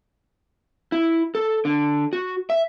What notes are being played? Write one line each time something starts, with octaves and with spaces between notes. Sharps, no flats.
E4
A4
D3
F#4
E5